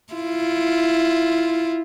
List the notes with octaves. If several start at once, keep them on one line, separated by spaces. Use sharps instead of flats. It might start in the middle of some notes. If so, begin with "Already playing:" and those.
E4 F4